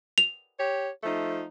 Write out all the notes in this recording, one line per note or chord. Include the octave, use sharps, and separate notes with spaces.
F7
G4 C#5
F3 A3 D#4